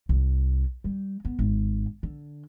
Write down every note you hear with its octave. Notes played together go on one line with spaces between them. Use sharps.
C2
G3
B3
G#1
D3